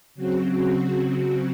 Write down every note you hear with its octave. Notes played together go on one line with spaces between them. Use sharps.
C#3 F#3 C4 F#4